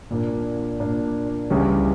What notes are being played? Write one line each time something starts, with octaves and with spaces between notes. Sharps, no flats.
A#2 A#3 D4
A#2 A#3 D4
C#2 C#3 E3 G3 C#4